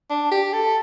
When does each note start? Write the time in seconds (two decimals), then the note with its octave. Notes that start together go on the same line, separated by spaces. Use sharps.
0.10 D4
0.31 G4
0.53 A4